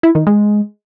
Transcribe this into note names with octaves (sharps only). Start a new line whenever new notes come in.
E4
D#3
G#3